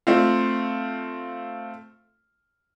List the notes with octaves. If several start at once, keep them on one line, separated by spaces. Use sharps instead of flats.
A3 C4 F4